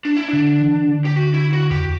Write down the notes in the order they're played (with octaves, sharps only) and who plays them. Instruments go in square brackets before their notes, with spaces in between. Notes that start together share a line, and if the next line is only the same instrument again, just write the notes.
[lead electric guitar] D4
E4
D4
[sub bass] D3
E3
D3
[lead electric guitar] G4
F#4
E4
F#4
[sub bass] E2 [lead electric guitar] G4